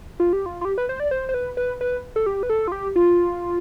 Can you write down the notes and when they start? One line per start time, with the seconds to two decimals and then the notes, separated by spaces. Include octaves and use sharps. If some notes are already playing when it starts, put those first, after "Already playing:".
0.20 F4
0.33 G4
0.46 F4
0.61 F4
0.65 G4
0.78 B4
0.89 C5
1.00 D5
1.11 C5
1.29 C5
1.34 B4
1.57 B4
1.81 B4
2.16 A4
2.26 G4
2.43 B4
2.50 A4
2.68 F4
2.72 G4
2.96 F4